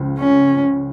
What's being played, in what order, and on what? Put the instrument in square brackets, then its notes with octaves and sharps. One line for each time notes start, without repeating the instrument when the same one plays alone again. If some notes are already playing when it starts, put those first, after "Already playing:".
Already playing: [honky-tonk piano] C#2 C#3 F3
[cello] C#4